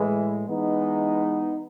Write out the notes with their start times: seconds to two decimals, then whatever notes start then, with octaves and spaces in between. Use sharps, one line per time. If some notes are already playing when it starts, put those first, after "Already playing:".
Already playing: A2 E3 G#3
0.48 E3 G#3 B3 D#4